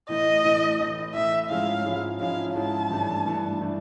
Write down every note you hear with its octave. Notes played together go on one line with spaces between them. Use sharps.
A2 E3 A3 D#5
A2 E3 A3
A2 E3 A3
A2 E3 A3 E5
G#2 F3 G#3 C#4 E4 F5
G#2 F3 G#3 C#4 E4
G#2 F3 G#3 C#4 E4 F5
G#2 F3 G#3 C#4 E4 A5
G2 E3 A3 D4
G2 E3 A3 D4
E3 A3 D4